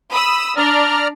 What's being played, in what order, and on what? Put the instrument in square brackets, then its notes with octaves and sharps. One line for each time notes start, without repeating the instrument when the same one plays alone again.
[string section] B5 D#6 E6
[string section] D4 [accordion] D5 A#5 F6